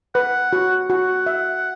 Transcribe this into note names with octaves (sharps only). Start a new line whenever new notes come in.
B4 F#5
F#4
F#4 F#5
E5